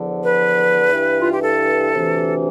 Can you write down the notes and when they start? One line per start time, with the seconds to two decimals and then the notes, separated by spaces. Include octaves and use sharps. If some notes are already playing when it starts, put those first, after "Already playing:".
Already playing: E2 D3 F3
0.23 B4
0.91 G2 E3
1.21 F4
1.31 G4
1.42 A4
1.94 D2 C3 E3